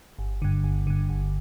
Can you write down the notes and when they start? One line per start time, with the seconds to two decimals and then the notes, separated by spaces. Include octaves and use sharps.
0.19 G1
0.42 G2 D3
0.64 G1
0.87 G2 D3
1.09 G1